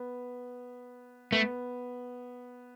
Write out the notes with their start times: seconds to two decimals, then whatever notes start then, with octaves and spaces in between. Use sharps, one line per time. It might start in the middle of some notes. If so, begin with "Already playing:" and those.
Already playing: B3
1.32 A3 B3